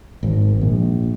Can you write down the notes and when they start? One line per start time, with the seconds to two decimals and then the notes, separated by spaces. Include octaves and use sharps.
0.23 G#1
0.61 A#1